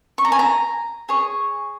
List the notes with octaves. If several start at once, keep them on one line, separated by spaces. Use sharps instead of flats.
C#6
A#5
G#5
A#5
G#4 C#5